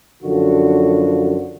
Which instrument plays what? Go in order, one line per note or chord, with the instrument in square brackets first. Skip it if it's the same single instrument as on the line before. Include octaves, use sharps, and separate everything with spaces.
[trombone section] F#2 D3 F3 F#4